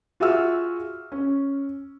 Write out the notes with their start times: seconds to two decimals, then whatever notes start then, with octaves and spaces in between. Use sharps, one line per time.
0.20 F4 F#4 G#4 E5 E6 F6
1.12 C#4